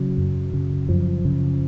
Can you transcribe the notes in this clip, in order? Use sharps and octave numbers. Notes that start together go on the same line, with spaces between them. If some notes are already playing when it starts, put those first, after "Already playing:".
Already playing: C#3 F#3
F#2
C#3
F#2 F3
C#3